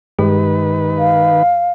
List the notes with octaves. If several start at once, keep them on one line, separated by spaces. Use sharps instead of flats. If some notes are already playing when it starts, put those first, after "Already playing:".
G2 D#3 G#3 G4 B4
F5